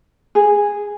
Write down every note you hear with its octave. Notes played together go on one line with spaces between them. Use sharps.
G#4